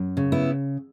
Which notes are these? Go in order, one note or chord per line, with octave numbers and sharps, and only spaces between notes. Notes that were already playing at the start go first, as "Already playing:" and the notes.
Already playing: F#2
C#3
B3 E4